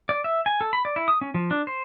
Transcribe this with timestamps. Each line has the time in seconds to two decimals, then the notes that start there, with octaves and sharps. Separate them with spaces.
0.09 D5
0.24 E5
0.46 G#5
0.61 A4
0.73 B5
0.85 D5
0.96 E4
1.08 D#6
1.21 C#4
1.34 F3
1.51 D4
1.67 C5